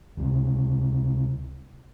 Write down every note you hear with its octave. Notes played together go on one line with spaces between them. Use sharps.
C#2 C3